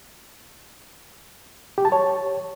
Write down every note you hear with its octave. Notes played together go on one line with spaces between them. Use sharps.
G4
A5
C#5